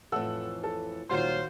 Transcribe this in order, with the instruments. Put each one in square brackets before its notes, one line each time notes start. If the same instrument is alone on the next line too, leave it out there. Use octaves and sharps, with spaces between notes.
[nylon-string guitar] F2 A2 E3 [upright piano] A4 F#5 E6
[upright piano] A4
[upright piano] D#2 F#4 C6 [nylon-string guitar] A#2 F#3 G3 [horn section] F4 C5